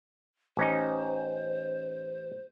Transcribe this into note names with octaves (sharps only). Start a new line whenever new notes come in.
A1 C#4 D#4 C5